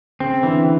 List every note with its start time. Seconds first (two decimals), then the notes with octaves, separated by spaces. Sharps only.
0.20 C#3 C4
0.43 D3 E3